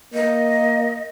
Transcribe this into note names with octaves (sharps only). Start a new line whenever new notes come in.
A#3 D#5